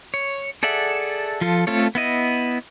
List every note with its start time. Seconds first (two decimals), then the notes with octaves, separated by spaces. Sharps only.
0.14 C#5
0.63 G#4 A4 D5 E5 F#5
1.41 F3 F4 A4
1.67 A3 C4 F4 A4 C#5
1.95 B3 E4 D#5